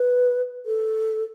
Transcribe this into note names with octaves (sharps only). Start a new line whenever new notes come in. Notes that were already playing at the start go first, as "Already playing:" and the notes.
Already playing: B4
A4